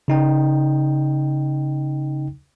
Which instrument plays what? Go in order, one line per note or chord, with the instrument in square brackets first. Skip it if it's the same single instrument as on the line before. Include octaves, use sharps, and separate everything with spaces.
[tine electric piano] C#3 D#4 G5